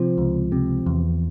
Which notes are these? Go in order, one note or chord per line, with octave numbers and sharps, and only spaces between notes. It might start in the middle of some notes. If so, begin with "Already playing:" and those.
Already playing: C3 F3
C#2
C3
E2